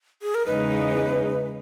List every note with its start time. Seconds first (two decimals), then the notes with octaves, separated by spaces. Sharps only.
0.22 G#4
0.35 A#4
0.46 E2 C#3 G#3 D#4 B4